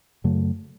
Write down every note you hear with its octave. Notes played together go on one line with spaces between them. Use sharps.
F#2 C#3 F#3 A3